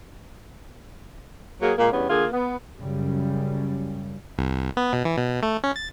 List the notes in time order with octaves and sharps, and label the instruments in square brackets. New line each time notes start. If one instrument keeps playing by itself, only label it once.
[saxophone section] F#3 A#3 G#4
A#2 G#3 A#3
E2 G2 B3 C#4
D3 A#3 F4 G#4
B3
[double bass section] F#2 C#3 G3
[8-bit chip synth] C2
B3
B2
E3
B2
A3
C#4
A6